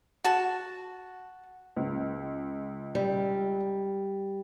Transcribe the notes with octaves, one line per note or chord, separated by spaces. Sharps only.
F#4 A5
C#2
G3